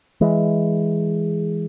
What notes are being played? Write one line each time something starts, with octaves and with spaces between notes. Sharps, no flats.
E3 G#3